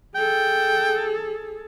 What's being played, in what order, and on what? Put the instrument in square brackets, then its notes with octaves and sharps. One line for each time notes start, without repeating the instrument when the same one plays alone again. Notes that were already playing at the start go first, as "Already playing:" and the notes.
[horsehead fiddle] G#4 A4 [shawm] G5